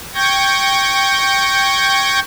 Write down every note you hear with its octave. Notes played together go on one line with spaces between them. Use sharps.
G5 C#6 G6 G#6 A#6